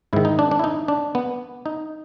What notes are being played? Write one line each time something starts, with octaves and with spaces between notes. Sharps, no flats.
G#2 D#3 E4
D#4
D4
D4
E4
D#4
D4
B3
D#4